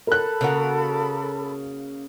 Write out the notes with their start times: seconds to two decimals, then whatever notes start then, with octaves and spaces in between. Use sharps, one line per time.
0.07 A4 A#4 B5 F#6
0.41 C#3 A#3 F#4